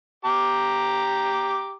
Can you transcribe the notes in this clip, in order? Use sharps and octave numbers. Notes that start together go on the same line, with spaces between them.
G4 A#5 D6